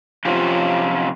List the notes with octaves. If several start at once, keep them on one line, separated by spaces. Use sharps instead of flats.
C3 F3 F#3 C#4 F4 G4